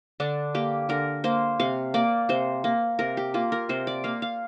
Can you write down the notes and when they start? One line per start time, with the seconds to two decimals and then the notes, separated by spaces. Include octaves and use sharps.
0.20 D3 D4
0.55 A#3 G4
0.89 D3 A#4
1.24 A#3 C5
1.60 C3 F5
1.94 A#3 D5
2.29 C3 C5
2.64 A#3
2.99 C3 A#4
3.17 G4
3.34 A#3 F4
3.52 A#4
3.69 C3 C5
3.87 D5
4.04 A#3 F5
4.22 F5